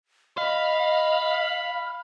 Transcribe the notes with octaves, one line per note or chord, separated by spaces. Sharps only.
D#5 F5 B5